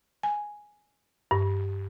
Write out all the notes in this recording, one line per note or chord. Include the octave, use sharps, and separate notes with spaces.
G#5
G2